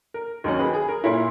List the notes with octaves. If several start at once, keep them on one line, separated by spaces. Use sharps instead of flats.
A#4
D#2 D#3 F#3 C#4 A#4
G#4 B4
G#4
A#4
A#2 A#3 E4 A#4 C#5